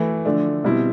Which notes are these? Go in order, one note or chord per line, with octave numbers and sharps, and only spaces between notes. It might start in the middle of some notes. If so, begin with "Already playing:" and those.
Already playing: E3 A3 E4
D3 F3 A3 D4
B2 G3 C4 E4